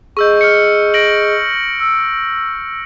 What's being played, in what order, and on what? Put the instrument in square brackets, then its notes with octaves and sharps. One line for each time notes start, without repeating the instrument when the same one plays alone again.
[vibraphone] G#4 D#5 [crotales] C#6 E6 G6
[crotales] F6 C#7
A#6 D7 F#7
[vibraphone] E6